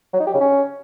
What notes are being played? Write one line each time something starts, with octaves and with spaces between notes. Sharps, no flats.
F#3
D#4
G4
C#3
C#4